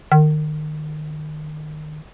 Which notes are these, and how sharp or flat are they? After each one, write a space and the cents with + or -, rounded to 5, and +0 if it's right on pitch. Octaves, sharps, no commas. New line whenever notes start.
D#3 -30